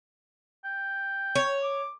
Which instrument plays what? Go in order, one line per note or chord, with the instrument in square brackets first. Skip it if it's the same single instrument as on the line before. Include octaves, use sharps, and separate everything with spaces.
[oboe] G5
[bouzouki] C#5
[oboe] D6